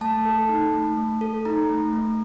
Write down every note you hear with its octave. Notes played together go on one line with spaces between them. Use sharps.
A3 A5
A4
D#4
A3
A3
A4
D#4 A#5
A3
A3